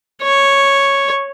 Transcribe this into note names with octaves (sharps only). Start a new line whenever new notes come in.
C#5